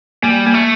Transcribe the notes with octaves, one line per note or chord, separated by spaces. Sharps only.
G3 A#3
A#3
A3